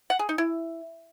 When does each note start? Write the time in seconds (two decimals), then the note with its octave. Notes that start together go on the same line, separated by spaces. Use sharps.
0.10 F#5
0.19 G#4
0.29 D#4
0.38 E4